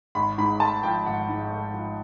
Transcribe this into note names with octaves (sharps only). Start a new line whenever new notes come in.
G#1 B5
G#2 B5
A3 A5
F3 G5
G#1 F#5
G#2
A3
F3